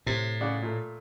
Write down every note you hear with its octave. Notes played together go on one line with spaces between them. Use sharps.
A2 C3
C#3 D5 F#5
A#2 A3